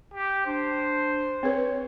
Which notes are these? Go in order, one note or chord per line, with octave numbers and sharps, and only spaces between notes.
G4
D4 C5
C4 G#4 B4 C#5